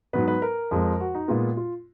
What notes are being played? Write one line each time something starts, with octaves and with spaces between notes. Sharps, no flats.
G#2 F#3 B3 B4
B4
A#4
F2 F3 G#3
F#4
D#4
A#2 G#3 B3 F4
F4